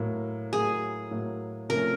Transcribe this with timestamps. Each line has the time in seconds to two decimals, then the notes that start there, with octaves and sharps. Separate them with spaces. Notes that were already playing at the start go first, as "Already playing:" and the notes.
Already playing: A2 F#3 A#3
0.53 A2 F#3 A#3 G#4
1.11 A2 F#3 A#3
1.69 C3 F3 A3 C#4 A#4